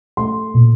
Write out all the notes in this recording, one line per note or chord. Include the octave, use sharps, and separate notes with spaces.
A3 C6
A#2